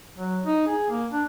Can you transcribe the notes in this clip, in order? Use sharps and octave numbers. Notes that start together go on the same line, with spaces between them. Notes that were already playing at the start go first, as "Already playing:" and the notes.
F#3
D#4
G#4
A#3
D4